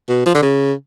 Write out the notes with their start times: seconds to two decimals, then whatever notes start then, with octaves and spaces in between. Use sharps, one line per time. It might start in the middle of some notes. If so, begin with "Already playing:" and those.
0.09 B2
0.26 F3
0.34 D3
0.42 C#3